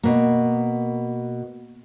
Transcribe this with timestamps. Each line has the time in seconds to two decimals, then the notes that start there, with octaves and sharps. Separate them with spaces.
0.03 B2 A#3